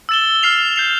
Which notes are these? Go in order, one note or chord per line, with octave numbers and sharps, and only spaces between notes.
E6 A6 E7 G7
F6 C7 F7
G6 C7 F7